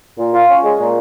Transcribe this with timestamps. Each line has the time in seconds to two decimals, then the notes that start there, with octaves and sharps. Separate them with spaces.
0.19 A#2
0.34 F4
0.49 C#4
0.64 G#3
0.79 A#2